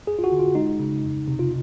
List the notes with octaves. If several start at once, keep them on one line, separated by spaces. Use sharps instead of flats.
F2 G#4
F4
F#4
D3
F4
G#3 D#4
C#3
F2
C3
F4